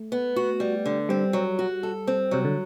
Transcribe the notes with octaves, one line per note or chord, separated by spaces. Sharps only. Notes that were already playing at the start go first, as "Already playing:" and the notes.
Already playing: A3
B3
F#4
G3
D3
G3 C4
F#3
F#4
A4
C4
C3 F#3
D3